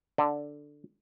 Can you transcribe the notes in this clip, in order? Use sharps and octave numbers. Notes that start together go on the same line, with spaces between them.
D3